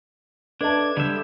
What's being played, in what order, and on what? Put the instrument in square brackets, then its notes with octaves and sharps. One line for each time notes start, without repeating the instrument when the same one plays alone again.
[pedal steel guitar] D4 [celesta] A4 D#5 E5 [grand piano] B4 A5 [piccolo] G#6
[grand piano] D3 G6 [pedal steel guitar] G3 E5 [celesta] A4